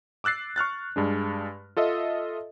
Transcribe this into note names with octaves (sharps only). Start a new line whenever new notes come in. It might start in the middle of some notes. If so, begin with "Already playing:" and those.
D6 E6 F#6 A6 C7
C#6 F6 F#6 A6
G2 G#3 D4
F4 A4 D#5 E5